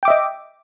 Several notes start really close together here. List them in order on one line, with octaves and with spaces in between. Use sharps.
G5 D6 E5 D#5